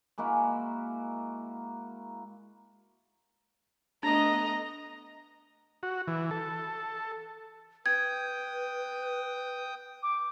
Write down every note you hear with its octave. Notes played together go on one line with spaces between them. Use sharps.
G#3 A#3 E4 F#4
A3 B3 D4 D#5 A#5
F#4
E3
A4
B4 G5 D#6 G#6
D6